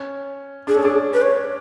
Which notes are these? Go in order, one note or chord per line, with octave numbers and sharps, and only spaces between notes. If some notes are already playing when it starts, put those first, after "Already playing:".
Already playing: C#4
D4 G#4
C#4 A4
D4 G#4
B4
C#5